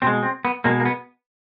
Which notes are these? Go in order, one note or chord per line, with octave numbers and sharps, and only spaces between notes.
B2 G#3 C4
C4
B3
B2 G#3 A#3
A#3
B3